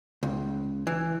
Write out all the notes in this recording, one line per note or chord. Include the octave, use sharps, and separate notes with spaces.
C#2
E3